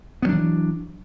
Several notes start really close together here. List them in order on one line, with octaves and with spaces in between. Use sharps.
B3 F#3 D4 E3